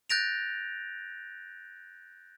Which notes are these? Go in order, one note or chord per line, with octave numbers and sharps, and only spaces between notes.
F#6 G6 A6 A#6 D7 F7